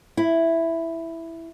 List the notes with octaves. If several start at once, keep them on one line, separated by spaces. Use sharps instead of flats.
E4